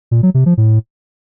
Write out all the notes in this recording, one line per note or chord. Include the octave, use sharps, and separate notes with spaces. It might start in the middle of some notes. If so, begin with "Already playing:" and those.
A#2
F#3
C3
F3
A2